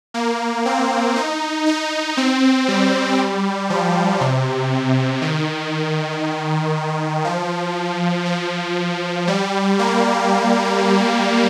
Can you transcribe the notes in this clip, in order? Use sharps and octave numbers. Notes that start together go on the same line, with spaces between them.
A#3
C4
D#4
D#4
C4
G3
F3
C3
D#3
F3
F3
G3
A#3